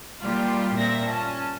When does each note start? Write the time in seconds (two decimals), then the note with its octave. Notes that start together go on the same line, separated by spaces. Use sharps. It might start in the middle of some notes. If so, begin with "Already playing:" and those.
0.24 A#2 G3 F4 G4
0.76 G2 A#2 C4 E5 A#6
1.07 C#4 A5